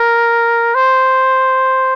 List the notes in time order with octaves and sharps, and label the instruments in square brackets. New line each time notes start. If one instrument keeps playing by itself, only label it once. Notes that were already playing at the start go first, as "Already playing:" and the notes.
Already playing: [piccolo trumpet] A#4
C5